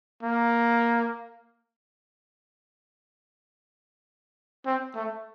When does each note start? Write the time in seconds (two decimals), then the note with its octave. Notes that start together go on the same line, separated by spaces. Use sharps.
0.23 A#3
4.66 C4
4.95 A3